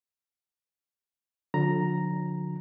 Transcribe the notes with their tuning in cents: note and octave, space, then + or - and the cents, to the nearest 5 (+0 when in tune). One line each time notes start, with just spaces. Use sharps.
D3 +0 F3 +45 A#5 +0